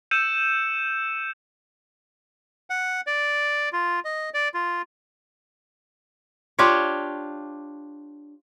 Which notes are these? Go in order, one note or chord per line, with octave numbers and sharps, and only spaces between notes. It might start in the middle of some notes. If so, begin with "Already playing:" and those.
E6 G6 C#7 D#7 E7
F#5
D5
F4
D#5
D5
F4
D4 F4 G4 C#5